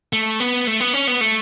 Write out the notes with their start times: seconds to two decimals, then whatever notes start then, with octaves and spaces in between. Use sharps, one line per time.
0.13 A3
0.40 B3
0.67 A3
0.80 B3
0.94 C#4
1.07 B3
1.21 A3